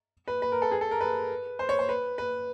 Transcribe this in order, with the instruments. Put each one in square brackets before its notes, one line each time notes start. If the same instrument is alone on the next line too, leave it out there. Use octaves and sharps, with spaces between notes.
[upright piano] B4
B4
A#4
A4
G#4
A4
A#4
B4
C5
C#5
C5
B4
B4